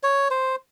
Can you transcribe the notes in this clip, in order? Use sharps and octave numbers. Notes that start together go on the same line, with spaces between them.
C#5
C5